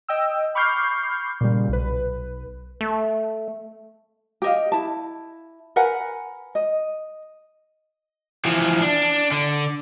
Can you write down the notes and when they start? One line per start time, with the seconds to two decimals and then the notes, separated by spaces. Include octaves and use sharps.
0.09 D#5 G5 E6
0.55 B5 C#6 D6 F6 G6 C7
1.41 A#2 C#3 G3
1.69 B1 B4
2.81 A3
4.42 G4 D#5 F5
4.72 E4 A5
5.76 A#4 B4 F#5 G#5
6.55 D#5
8.45 E3 F3
8.81 D4
9.31 D3